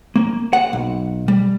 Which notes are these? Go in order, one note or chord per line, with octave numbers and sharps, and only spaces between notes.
A#3
F#5
B1
G3